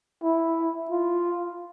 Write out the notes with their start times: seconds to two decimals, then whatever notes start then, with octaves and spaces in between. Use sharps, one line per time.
0.23 E4
0.91 F4